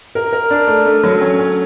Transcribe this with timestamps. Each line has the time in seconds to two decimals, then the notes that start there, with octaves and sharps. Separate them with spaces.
0.15 A#4
0.33 A#4
0.51 D4
0.68 A3
0.86 A3
1.04 F#3
1.21 C#4
1.39 C#4